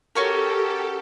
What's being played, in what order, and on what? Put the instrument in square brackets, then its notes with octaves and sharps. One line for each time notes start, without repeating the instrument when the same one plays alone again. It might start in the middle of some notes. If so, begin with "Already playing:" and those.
[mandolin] C#4 F#4 A#4 [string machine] G4 A4